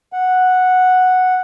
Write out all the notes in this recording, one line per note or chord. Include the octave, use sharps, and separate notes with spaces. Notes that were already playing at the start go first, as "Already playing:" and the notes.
F#5